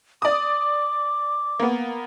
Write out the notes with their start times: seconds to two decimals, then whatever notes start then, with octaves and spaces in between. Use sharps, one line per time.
0.22 D5 D6 D#6
1.60 A#3 B3